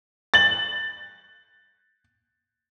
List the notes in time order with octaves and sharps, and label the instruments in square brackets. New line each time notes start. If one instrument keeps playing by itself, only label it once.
[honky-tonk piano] A6 F#7